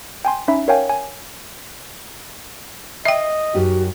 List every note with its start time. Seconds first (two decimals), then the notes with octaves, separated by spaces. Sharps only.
0.25 G5 G#5 C6
0.48 C#4 D#4 E5 B5
0.68 A#4 C#5 F5 G5 G#5
0.89 G#5
3.05 D#5 E5 G5
3.55 F#2 D#4 F#4 G4